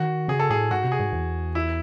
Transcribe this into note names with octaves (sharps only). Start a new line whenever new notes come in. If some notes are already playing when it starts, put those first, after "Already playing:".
Already playing: D#3 F#4
C#3 G#4
A4
A2 G#4
G#2 F#4
C3
G#4
G#2
E2
E4